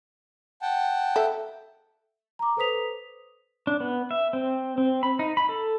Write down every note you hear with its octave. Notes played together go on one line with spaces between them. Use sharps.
F#5 G5 A5
A4 E5
A#5 D6
A4 B4 C5 D#6 B6 F7
D4
B3
E5
C4
C4
B5
D#4
B5
A4